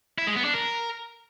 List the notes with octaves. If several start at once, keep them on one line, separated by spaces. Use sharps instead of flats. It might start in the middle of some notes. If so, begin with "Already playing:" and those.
E4
G#3
B3
D4
A#4